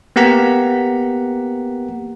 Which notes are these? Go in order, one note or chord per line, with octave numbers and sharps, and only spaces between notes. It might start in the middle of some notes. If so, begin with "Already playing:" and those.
A#3 B3 G4 F#5 A#5 B6